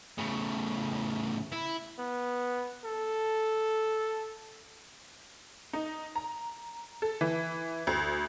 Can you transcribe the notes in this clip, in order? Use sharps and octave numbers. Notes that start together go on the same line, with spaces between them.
A2 C#3
E4
B3
A4
D#4
A#5
A4
E3
D2